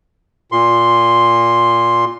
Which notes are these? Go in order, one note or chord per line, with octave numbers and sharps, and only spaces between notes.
A#2 C6